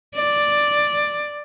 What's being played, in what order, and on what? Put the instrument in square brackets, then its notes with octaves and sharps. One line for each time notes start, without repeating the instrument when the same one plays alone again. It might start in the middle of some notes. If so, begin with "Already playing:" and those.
[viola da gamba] D5